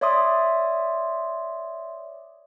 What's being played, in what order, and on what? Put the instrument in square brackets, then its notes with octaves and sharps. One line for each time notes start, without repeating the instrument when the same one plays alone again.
[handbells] C#5 D5 E5 C6 D6 D#6